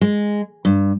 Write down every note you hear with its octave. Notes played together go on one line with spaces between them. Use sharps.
G#3
G2